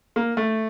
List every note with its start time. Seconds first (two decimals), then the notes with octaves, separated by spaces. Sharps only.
0.16 A#3
0.37 A3